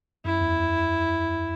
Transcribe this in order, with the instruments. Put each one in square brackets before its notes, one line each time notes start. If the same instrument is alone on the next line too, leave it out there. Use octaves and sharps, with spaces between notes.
[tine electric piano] F#2 [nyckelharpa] E4
[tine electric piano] E2
F#2